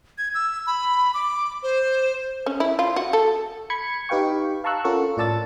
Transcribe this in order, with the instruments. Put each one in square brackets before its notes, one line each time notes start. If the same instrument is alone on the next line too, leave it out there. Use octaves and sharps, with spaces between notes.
[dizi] G#6
E6
B5
D6
C5
[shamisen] C#4
E4
F4
F#4
A4
[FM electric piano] B5 G#6 C#7
D#4 G4 B4 F5 G5 C#6
F5 A5 A#5 C#6 E6 F#6
C#4 F4 A4 A#4 F#5 C#6
A2 F4 D5 A5 E6 A6